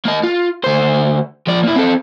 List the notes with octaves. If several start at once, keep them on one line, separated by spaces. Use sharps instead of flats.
A#3 D#5
F4
D2 C5
F3 D5
A#3 E4
C4 A4